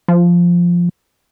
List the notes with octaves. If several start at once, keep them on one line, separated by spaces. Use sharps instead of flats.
F3